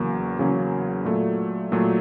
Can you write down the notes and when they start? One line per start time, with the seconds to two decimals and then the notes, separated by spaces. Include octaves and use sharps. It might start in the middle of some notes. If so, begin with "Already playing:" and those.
Already playing: E2 C#3 F#3 A#3 C#4
0.39 E2 C#3 F#3 A#3 C#4
1.05 A#2 F#3 A3
1.72 A#2 F#3 A3